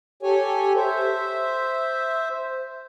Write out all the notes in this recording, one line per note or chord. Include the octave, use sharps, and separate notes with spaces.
G4 A4 C#5 G#5
C5 E5